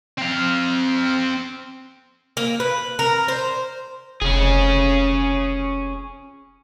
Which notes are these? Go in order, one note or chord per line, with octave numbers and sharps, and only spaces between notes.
C4 F5
A#3
B4
A#4
C5
F1 C#4 G#4